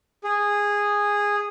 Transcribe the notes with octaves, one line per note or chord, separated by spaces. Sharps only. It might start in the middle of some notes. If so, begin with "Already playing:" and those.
G#4